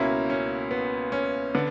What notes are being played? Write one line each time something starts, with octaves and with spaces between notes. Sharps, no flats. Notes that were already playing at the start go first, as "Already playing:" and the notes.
Already playing: C#2 B2 A#3 C#4 E4
C#4
B3
C#4
D3 B3